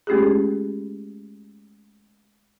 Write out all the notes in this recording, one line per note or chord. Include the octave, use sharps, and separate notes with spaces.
G#3 A3 C#4 F4 G4 G#4